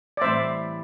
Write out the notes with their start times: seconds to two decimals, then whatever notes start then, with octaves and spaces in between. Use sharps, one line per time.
0.17 D5
0.21 A2 E3 G3 C4 C5 E5